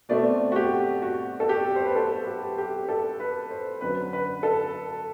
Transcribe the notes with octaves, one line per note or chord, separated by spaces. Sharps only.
B2 A3 C4 D5
F#4
G4
F#4
A4
G4
C5
B4
A4
G4
G4
A4
B4
C5
F#2 D3 F#3 B4
B4
A4